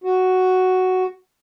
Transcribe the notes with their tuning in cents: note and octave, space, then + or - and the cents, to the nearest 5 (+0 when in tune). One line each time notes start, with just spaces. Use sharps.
F#4 +5